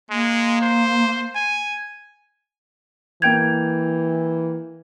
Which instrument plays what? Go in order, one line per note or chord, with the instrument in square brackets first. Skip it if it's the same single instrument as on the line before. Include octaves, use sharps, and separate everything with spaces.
[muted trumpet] G#3 [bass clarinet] A#3
[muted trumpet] C5
G#5
[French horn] E3 [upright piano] A#3 D7 F7 [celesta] G5 G6 G#6